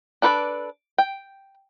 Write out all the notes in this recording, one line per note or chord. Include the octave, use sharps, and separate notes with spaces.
D4 A4 B4 C5 D5
G5